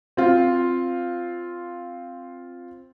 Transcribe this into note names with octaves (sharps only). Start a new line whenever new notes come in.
C4 F4